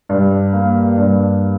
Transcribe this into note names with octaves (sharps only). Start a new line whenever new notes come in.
G2
A#3
G2